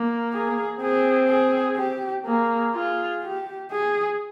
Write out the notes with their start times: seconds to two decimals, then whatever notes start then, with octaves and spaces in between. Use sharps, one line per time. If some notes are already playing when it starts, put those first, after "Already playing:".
Already playing: A#3
0.33 G#4
0.81 C4 G#4
1.29 G#4
1.77 G4
2.26 A#3 G#4
2.75 F4 G#4
3.23 G4
3.71 G#4